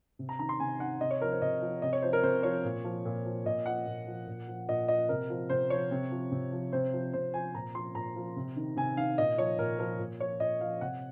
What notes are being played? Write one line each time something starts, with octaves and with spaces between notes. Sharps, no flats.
C3
A#5
D#3 A#5
C6
C3 G#5
D#3 F#5
C3 D#5
C#5
F3 A#4
C5
C3 D#5
F3
C3 D#5
C#5
F3 C5
A#4
C3 C5
F3 C#5
A#2
F3
A#2
F3
A#2 D#5
F3 F#5
A#2
F3
A#2
F3
A#2 D#5
F3 D#5
C3 A#4
F3
C3 C5
F3 C#5
C3
F3
C3
F3
C3 C5
F3
C3 C5
F3 G#5
A#2 A#5
F3 C6
A#2 A#5
F3
C3
D#3
C3 G#5
D#3 F5
A#2 D#5
F3 C#5
A#2 A#4
F3 A#4
A#2
F3 C#5
A#2 D#5
F3 F5
C3 F#5